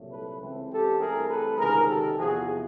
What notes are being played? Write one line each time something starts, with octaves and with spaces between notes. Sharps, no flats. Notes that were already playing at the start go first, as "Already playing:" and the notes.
Already playing: C2 A#2 F#3 A3
A4 B4
C#2 C#3 E3 A3 C4
G4 A4
G2 E3 A3 C4 G#4 A#4
A4 B4
C#2 C3 D#3 G#3 C4 G#4 A#4
G4 A4
E2 C3 F3 F#4 G#4